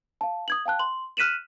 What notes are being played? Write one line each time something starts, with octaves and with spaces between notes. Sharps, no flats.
F5 A5
D#6 G#6 F#7
F5 G5 A5 F#6
C6 F#7
F6 F#6 B6 D#7 E7 F#7